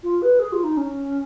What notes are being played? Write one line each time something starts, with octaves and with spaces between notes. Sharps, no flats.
F4
B4
G#4
F4
D#4
C#4